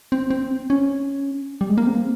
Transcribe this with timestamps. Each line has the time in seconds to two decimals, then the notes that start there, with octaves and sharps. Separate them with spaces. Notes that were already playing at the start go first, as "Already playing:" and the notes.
0.12 C4
0.30 C4
0.70 C#4
1.61 G3
1.70 G#3
1.78 A#3
1.87 C4